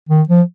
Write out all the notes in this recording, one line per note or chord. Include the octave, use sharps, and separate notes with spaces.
D#3
F3